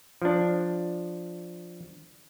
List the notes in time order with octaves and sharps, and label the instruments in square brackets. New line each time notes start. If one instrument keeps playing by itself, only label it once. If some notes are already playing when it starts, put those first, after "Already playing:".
[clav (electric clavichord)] F3 D4